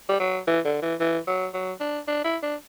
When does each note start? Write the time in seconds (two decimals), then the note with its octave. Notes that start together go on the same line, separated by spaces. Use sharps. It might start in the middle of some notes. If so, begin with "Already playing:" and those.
0.09 G3
0.20 F#3
0.47 E3
0.65 D3
0.82 E3
1.00 E3
1.28 F#3
1.54 F#3
1.80 D4
2.07 D4
2.25 E4
2.43 D4